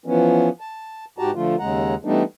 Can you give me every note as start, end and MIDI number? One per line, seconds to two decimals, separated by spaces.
0.06 0.49 52
0.06 0.49 53
0.06 0.49 59
0.06 0.49 61
0.60 1.05 81
1.19 1.31 44
1.19 1.31 66
1.19 1.31 67
1.19 1.31 81
1.19 1.31 82
1.35 1.55 50
1.35 1.55 53
1.35 1.55 57
1.35 1.55 65
1.59 1.95 39
1.59 1.95 49
1.59 1.95 56
1.59 1.95 78
1.59 1.95 82
2.05 2.23 52
2.05 2.23 55
2.05 2.23 57
2.05 2.23 59
2.05 2.23 62
2.05 2.23 63